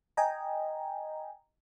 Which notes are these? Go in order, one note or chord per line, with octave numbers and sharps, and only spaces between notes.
D#5 G5 G#5 A#5